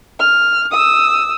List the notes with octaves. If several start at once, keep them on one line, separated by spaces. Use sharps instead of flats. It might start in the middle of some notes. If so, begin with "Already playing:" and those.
F6
D#6 E6